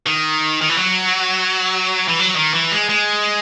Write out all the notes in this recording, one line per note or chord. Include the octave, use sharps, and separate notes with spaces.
D#3
D#3
E3
F#3
E3
F#3
D#3
E3
G#3
G#3